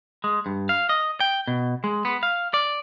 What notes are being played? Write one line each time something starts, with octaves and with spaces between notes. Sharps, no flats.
G#3
G2
F5
D#5
G5
B2
G#3
B3
F5
D5